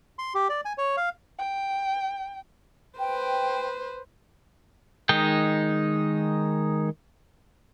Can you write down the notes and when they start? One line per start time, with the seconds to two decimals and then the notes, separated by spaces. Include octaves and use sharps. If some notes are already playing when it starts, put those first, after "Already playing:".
0.19 C6
0.35 G4
0.49 D5
0.65 G#5
0.78 C#5
0.97 F5
1.39 G5
2.99 B4 C5 G5
5.09 D#3 G#3 D#4 G5